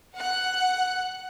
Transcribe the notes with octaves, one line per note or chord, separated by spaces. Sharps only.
F#5 F#6